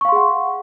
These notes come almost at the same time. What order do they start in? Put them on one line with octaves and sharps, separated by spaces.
C#6 F5 C6 G#4 F#5